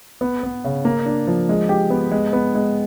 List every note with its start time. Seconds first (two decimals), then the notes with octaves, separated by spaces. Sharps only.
0.21 B3
0.43 B3
0.64 C#3
0.85 A#3
1.06 D4
1.27 F3
1.49 G#3
1.69 G4
1.90 B3
2.11 G#3
2.33 B3
2.55 G#3